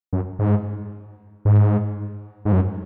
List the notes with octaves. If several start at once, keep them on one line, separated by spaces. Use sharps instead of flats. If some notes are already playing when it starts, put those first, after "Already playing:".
F#2
G#2
G#2
G#2
F#2